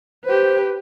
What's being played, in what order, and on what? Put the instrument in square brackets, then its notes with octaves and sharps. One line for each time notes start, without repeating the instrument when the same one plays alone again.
[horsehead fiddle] G4 B4 [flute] C5